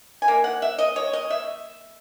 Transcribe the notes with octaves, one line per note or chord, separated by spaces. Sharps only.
G#5
D#3 A#3
F#5
E5
D#5
C#5
D#5
E5